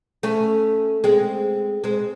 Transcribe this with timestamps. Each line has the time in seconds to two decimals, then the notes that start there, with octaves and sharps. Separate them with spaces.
0.23 A3 C#4
1.04 G#3 C4
1.84 G#3 C4